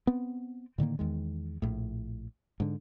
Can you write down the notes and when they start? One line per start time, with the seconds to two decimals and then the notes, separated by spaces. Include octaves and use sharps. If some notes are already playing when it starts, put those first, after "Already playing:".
0.07 B3 C4
0.78 A2 D3 D#3 A#3
0.99 E2 D#3 G#3
1.62 A#1 A2
2.60 G#2 D3